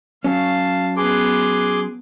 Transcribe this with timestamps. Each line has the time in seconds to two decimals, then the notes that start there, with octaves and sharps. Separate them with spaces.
0.24 F#3 C#4 F5 A5
0.97 B3 G#4 B4 C6 D6